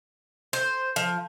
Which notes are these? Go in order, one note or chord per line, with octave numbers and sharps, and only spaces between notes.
C5
F3